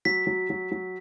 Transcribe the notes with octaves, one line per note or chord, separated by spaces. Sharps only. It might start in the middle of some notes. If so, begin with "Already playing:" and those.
F#3 B6
F#3
F#3
F#3